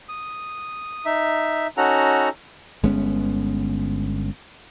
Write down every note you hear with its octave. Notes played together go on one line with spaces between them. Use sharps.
D#6
D#4 E5
C#4 D#4 F#4 A4 F#5 A#5
G1 G#3 B3 C#4